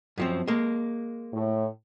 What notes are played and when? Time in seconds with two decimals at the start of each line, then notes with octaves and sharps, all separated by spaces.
0.18 F#2 F3 C4
0.47 G#3 A#3
1.32 A2